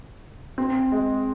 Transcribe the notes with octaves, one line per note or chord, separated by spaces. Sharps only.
C4
G#3